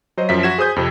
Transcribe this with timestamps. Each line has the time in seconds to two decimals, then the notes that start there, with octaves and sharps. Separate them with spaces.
0.17 F#3 C5 D#5
0.29 F#2 F3 E5 B6
0.43 F#4 G#6 E7
0.58 G#4 C5 D#6 G6
0.76 F2 C3